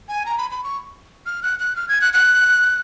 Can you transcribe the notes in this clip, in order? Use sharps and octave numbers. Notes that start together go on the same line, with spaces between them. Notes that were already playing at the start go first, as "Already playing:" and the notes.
G#5
A#5
B5
B5
C#6
F6
F#6
F#6
F6
G#6
F#6
F#6